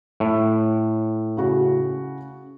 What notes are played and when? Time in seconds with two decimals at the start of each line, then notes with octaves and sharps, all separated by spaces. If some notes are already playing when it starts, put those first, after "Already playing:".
0.20 A2
1.37 C#3 F#4